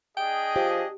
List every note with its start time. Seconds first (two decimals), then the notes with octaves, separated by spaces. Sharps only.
0.17 D4 G#4 D#5 G5
0.56 F3 G4